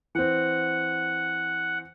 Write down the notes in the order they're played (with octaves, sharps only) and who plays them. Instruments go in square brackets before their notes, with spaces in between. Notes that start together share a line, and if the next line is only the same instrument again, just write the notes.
[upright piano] E3 C4 [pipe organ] F#5